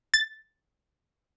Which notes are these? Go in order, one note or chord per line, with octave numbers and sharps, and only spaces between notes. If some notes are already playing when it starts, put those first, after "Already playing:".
A6